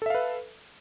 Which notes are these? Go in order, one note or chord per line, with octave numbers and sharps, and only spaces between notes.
A4 B4 E5 F5